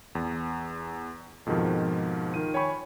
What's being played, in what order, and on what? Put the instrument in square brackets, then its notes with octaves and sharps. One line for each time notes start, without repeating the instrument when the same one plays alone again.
[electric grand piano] E2
F2 G#2 B2 D#3 F3
D#3 F4 D#7
C#5 G5 G#5 B5 C#6